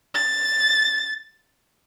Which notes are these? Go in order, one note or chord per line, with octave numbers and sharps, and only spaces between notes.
A6